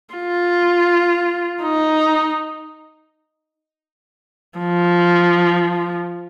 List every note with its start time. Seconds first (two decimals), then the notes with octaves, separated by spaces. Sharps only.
0.15 F4
1.63 D#4
4.59 F3